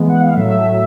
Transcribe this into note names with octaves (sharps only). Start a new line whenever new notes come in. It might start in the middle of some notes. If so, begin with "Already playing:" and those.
Already playing: E3 G#3 B3
F#5
F5
A2 F#3 A3 E5